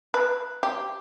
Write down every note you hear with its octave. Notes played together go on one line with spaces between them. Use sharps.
B4
G4